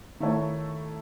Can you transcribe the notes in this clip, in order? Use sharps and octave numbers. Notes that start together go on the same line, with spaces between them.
D#3 A3 E4 A4 C#5